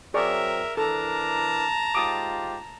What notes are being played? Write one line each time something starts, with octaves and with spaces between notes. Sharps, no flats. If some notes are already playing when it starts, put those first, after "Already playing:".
F#3 C4 G#4 A#4 D5 E5 C#6
E3 D4 A4 A#4 A5 A#5
G#2 F4 G4 D6 D#6